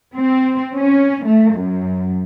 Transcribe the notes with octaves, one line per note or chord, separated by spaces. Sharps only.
C4
C#4
A3
F#2